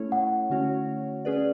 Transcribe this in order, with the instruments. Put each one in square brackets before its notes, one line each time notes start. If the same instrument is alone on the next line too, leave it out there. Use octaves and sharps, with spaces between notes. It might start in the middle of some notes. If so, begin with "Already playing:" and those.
Already playing: [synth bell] A3 C#4 E4 A4 C#5
[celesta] F#5
[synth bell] D3 A3 C#4 F#4 C#5
C#4 G#4 B4 D5